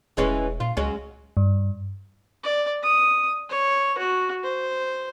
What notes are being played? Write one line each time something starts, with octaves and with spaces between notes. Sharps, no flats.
E1 E3 G#3 C#4
A#2 F4
C#2 F#3 G#3 C#4
G2
D5
D#6
C#5
F#4
C5